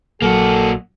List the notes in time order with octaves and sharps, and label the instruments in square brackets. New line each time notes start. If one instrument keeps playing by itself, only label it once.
[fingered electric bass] A#1 F#3 [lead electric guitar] A#3 F#4 [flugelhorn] A4